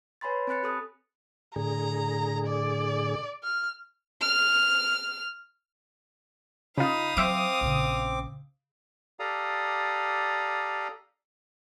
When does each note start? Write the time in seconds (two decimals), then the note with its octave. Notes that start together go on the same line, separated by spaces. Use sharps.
0.21 B4 C#5 G#5 B5 C6 A6
0.47 C4 G#5 B5 F#6 A6 C#7
0.63 G4 A4 D#6 F#6
1.56 A2 D3 G#4 A#5
2.47 D5
3.44 F6
4.22 F6
6.78 C#3 D#4 F4 F5 B5 D#6
7.17 F#3 C4 C5 E5 D6 D7
7.61 A#1 C#3
9.19 G4 A4 D5 F5 A#5 D#6